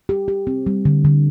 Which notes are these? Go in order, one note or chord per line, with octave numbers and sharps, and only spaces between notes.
G4
G4
C4
G3
D3
D3